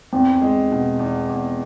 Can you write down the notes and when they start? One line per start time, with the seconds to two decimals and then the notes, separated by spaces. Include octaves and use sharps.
0.13 E2 C4
0.41 G#3
0.71 B2
0.99 E2
1.29 E2